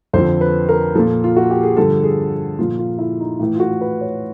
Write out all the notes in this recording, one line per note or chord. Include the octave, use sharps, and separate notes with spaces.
F2 D3 F3 C5
B4
A#4
A#2 F3 A4
F4
F#4
G4
G#4
G2 D3 F3 A4
G#4
A#2 F3 F4
F4
E4
D#4
A2 E3 E4
F4
F#4
B4
C#5